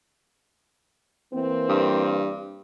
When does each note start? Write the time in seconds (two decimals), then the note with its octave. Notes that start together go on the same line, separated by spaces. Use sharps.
1.34 E3 A#3 C4
1.69 G2